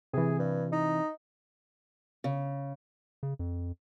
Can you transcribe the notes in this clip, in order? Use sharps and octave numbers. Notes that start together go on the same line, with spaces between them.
C3 E3 G#4
G2
D#4
C#3
C#3
F2